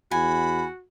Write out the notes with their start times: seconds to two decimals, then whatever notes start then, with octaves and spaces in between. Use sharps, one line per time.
0.11 E2 F#4 G#5 B5